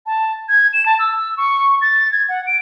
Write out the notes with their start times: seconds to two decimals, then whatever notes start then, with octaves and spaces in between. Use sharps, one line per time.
0.06 A5
0.49 G#6
0.73 E7
0.86 A5
0.99 E6
1.37 C#6
1.81 A6
2.12 G#6
2.29 F#5
2.47 D7